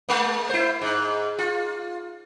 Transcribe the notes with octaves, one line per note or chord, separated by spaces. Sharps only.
G#3 A#3
E4 C5
G#2
F4